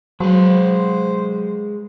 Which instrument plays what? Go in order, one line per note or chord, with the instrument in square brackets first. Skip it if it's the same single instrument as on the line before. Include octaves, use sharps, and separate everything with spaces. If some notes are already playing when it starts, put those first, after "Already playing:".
[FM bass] F#3 [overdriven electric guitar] G#3 B4 [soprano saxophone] C5